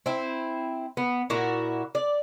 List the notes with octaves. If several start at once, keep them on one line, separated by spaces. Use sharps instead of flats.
C4 E4
B3
A#2 E4 F#4
D5